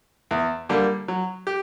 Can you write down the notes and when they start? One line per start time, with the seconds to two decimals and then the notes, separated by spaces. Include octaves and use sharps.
0.31 E2
0.69 D3 G3 A#3
1.08 F#3
1.47 G4